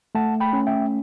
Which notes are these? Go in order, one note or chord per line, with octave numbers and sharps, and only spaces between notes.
A3 F#5 A5
G5 B5
C#4
E5 G5